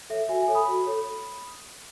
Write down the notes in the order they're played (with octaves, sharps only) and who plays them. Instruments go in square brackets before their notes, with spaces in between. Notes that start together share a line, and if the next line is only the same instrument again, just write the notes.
[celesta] A4 C#5 E5
F#4 E5 G#5
E5 G#5
A4 C#5
B5 D#6
F#4
A4 C#5